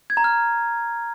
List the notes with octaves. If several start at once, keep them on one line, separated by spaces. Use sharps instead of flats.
G#6
A#5
F6